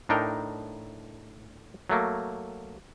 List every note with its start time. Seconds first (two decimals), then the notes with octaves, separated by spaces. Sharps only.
0.09 A2 D4 D#4 A#4 G5
1.90 F#3 A3 A#3